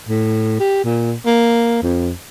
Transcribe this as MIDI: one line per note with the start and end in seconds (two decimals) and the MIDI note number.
0.09 0.59 45
0.60 0.82 67
0.84 1.13 46
1.25 1.79 58
1.82 2.12 41